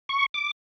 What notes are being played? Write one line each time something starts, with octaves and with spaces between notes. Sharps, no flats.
C#6
D6